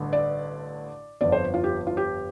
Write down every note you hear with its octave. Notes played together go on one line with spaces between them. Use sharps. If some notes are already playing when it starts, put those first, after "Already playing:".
Already playing: A1 G2 D3
D5
G1 F2 F3 D5
C5
F4
G4
F4
G4